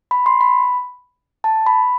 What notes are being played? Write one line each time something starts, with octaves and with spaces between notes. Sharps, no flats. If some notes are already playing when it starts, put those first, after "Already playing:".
B5
C6
B5
A5
B5